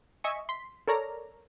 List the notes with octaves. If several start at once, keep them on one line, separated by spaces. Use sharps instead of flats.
D#5 E5 G#5 C#6
C6 B6
A4 A#4 C#5 D5 A#5